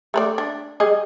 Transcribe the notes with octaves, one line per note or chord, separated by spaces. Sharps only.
A3 B4 D5
D4
G3 G#4 D#5